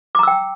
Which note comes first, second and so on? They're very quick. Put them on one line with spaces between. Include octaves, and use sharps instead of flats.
D6 A#5 E6 G5